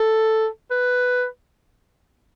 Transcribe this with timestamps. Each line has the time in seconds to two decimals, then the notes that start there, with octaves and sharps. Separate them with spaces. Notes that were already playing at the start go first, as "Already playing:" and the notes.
Already playing: A4
0.70 B4